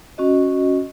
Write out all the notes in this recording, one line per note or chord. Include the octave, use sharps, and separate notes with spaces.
C#4 F#4 D#5